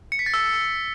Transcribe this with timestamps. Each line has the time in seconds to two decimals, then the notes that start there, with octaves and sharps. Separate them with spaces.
0.12 C#7
0.19 B6
0.26 A6
0.34 E6